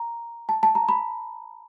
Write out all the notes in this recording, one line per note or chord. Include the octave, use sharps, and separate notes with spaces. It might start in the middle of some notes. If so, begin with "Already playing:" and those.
Already playing: A#5
A5
A5
A#5
B5